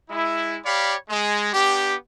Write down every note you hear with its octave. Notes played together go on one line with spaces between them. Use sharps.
G#3 E4
G4 C#5 D5 F5 B5
G#3
B3 D4 G4